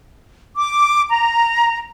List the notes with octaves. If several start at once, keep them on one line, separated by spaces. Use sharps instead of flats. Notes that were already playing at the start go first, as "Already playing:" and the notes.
D6
A#5